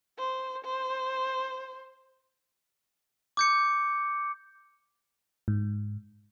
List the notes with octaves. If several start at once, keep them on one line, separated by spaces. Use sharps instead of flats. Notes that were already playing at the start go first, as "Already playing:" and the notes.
C5
C5
D6 G6 C#7
G#2